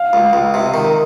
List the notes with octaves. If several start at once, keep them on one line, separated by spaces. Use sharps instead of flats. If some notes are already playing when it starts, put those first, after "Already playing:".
Already playing: F5
C#2
C#2
C3
D#3